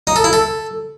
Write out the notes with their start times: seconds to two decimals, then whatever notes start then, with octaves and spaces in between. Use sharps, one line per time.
0.07 D#4
0.16 A4
0.24 E4
0.33 A4